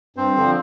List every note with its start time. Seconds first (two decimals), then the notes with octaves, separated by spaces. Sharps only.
0.16 G2 C4 C5
0.36 D3 F3